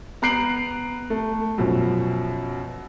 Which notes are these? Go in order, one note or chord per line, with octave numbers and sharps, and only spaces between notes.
B3 A#5 F#6 C7 D7 F#7
A3
F#2 B2 F3